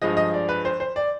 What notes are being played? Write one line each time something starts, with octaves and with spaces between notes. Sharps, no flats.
G2 F3 G#3 D#5
D#5
D5
B4
C5
C5
D5